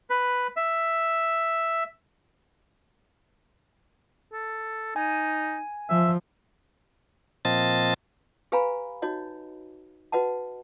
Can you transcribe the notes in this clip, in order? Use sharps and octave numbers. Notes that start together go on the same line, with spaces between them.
B4
E5
A4
D#4 G#5
F3 E5
A#2 F3 C4 D#5 A5 A6
G4 B4 F5 G#5 A#5 B5
D#4 F#4 C#5 D#5
F#4 B4 D#5 F#5 A5